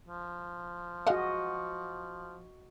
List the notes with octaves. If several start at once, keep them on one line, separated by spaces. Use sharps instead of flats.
F3
G#3 F#4 D#5 F5 F#5